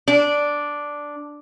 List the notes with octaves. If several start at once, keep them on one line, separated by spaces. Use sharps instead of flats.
D4